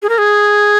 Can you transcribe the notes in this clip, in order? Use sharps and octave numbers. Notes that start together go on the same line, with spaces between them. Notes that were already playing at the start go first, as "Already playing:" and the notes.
G#4
A#4
G#4